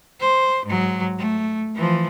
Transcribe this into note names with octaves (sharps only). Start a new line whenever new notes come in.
C5
G#2 F#3
A3
E3 F3